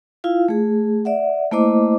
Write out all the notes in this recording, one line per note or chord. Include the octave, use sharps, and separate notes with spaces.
E4 F4 F5
A3 G#4
D5 E5 F#5
A3 A#3 E4 C5 D#5 D6